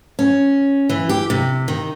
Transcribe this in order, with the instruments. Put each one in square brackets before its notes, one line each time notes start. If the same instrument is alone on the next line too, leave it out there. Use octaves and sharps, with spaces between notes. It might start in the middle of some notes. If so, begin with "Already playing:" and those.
[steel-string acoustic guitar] C#4
E3
G4
C3
D#3